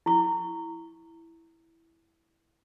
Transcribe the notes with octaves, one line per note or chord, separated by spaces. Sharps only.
E4 C#6